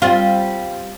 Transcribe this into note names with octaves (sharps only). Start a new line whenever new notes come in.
G3 C4 F4